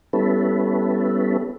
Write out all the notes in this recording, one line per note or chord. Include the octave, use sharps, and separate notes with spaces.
G3 B3 C#4 E4 A4 B4